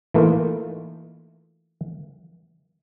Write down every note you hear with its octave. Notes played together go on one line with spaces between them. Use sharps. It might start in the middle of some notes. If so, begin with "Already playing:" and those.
E3 A3 A#3 D#4 F4